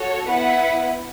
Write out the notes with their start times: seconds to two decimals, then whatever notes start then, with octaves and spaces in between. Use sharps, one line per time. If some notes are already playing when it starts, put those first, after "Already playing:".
Already playing: F#4 A4 C#5
0.26 B3 E4 B4 F#5